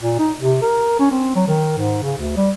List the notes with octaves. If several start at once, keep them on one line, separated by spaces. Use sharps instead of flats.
A#2
D#4
C3
A#4
C#4
C4
F#3
D#3
G#2
C#3
D2
G3